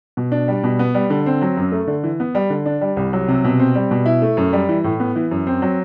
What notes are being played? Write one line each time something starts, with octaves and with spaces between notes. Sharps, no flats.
B2
D4
G3
B2
B3
G3
D3
C4
F#3
F#2
A3
D3
E3
B3
G3
D3
D4
G3
C2
F#3
C3
B2
C4
G3
B2
E4
A3
F#2
G3
E3
A2
B3
E3
F#2
C4
F#3